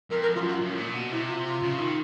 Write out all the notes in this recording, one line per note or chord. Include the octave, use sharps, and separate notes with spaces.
F2 A#4
A#4
F#2 F4
F4
F#2
A2
A#2
B2
C3 E4
F4
F4
C#3
D#3